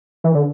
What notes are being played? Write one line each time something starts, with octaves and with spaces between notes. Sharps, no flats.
E3
D3